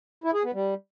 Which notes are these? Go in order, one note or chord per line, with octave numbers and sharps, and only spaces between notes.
E4
G#4
B3
G3